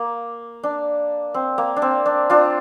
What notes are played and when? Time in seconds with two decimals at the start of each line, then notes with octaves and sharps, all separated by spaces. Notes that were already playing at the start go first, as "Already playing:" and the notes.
Already playing: A#3
0.63 D4
1.34 C4
1.58 A#3
1.76 D4
1.82 C4
2.06 D4
2.30 D4 F4